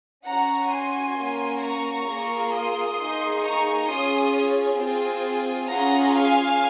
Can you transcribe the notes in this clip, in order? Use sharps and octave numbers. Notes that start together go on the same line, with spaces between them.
C#4 F#4 F#5 A#5
G#5 C6
A#3 C#4 F#4
A#5 C#6
A#3 F4 G#4
C6 D#6
A#3 D#4 G#4
A#5 C#6
C#4 F4 G#4 C6 D#6
C4 F4 G#4
C#4 F4 G#4 F#5 A#5
F5 G#5